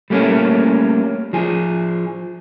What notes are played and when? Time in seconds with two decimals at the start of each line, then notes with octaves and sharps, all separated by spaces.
0.10 G3 A3 A#3 C#4
1.33 F3 G#4